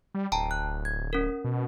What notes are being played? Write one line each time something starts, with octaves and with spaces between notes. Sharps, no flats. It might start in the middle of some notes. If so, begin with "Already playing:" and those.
G3
D1 G5 A5 A#5
F#6
G#6
C#4 A#4
B2